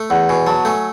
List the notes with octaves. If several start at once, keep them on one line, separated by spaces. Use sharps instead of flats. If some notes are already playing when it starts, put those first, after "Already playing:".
Already playing: A3
E2 F#5
B2 G#5
F#3 A5
A3 G#5